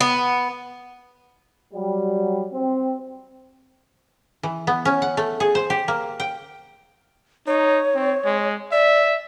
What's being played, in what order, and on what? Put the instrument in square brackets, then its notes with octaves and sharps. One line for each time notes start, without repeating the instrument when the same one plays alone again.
[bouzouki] B3
[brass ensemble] F#3 G3
C4
[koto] E3
B3
C#4
F#5
A3
G#4
C5
G4
A#3
G5
[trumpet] D#4 [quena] C#5
[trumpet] C4
G#3
[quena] D5 [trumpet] E5